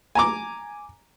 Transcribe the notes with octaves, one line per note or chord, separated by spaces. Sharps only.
G#5 A#5 D6